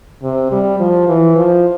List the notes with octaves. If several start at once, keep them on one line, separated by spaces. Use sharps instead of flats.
C3
G3
F3
E3
F3